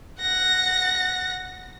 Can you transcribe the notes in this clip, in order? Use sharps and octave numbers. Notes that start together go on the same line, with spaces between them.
F#5 A#6